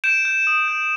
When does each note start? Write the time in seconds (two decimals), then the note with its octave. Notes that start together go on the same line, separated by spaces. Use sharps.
0.04 G6 D7 E7
0.25 G6
0.47 D#6
0.68 G6